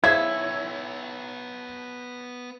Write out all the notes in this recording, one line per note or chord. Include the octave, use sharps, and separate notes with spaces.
B3 E4 G#4 C5 C#5 F5 G#6